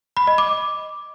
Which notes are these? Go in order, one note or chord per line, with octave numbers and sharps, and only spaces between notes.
B5
D#5
D6